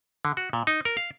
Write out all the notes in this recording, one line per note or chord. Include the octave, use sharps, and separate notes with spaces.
D3
F#4
A#2
D#4
A#4
F5